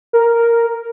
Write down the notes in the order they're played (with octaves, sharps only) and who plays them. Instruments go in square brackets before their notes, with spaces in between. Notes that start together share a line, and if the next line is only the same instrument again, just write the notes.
[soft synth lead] A#4